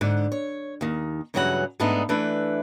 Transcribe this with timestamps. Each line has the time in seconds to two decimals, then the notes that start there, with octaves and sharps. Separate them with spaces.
0.01 G#2 D3
0.32 C#5
0.81 D#2 D#3
1.34 G2 C#3 E3 F#3 G#3 F#5
1.80 G#2 G#3 A3 B3 D4 D#4
2.09 E3 A3 D4 B4